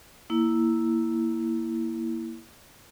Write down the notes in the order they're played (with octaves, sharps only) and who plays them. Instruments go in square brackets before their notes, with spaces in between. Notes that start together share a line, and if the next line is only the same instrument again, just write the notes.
[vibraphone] A#3 E4